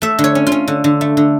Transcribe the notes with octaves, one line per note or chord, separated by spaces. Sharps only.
A3 E5
D3
C#5
C#4
F4
C#4
D3
D3
A3
D3